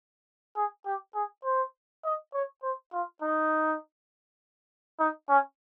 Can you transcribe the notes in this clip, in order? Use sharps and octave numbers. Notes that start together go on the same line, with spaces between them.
G#4
G4
G#4
C5
D#5
C#5
C5
F4
D#4
D#4
C#4